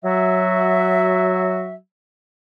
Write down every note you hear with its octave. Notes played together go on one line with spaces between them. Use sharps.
F#3 F#4 E5